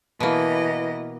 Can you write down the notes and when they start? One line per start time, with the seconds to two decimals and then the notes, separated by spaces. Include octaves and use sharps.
0.20 B2 E3 A#3 D#5